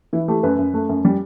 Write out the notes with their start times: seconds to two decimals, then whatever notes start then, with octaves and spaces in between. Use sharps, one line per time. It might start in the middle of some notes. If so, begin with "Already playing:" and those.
0.13 E3 E4
0.28 A3 G4
0.43 F#2 B4
0.59 F#2
0.74 A3
0.89 F#2
1.05 G3